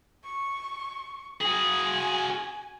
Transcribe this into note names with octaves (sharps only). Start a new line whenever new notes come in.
C#6
F#4 G#4 G#5